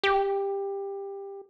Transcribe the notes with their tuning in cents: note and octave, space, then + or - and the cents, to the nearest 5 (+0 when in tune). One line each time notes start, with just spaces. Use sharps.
G4 +15